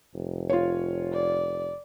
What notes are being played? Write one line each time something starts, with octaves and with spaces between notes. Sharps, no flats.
F1
F4 C#5
D5